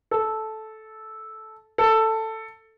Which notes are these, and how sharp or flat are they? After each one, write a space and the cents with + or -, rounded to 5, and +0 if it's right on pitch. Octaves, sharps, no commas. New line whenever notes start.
A4 -10
A4 +10